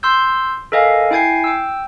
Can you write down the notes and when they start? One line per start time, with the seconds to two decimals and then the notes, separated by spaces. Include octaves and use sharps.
0.03 C6 E6 G6
0.72 A4 A#4 D#5 F5 G#5
1.11 E4 G5 G#5 G#6 C7
1.44 G5 E6